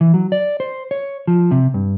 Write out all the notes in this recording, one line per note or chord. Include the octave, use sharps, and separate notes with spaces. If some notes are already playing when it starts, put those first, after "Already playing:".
E3
F#3
D5
C5
C#5
F3
C3
G2